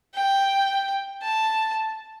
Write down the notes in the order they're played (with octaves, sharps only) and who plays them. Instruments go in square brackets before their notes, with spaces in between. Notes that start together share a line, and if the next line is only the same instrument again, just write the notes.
[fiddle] G5
A5